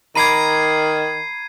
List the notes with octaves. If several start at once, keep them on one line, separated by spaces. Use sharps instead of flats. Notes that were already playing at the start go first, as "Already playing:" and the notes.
D#3 A#5 B5 D6 G#6 C7 D#7